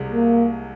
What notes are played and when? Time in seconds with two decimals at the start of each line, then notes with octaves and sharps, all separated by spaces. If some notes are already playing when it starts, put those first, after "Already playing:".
Already playing: C2 C3 G#3
0.12 A#3